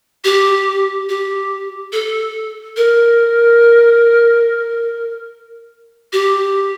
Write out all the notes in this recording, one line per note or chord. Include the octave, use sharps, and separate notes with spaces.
G4
G4
A4
A#4
G4